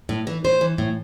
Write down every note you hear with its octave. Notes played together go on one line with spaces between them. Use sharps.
A2
E3
A2 C5
E3
A2